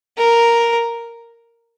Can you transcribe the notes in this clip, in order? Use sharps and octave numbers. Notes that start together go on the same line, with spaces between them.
A#4